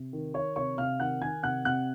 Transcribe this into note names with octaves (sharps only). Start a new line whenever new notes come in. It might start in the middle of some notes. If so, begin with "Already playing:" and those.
Already playing: C3
D#3
D#3 C#5 C#6
C3 C#5 C#6
C3 F5 F6
D#3 F#5 F#6
D#3 G#5 G#6
C3 F#5 F#6
C3 F#5 F#6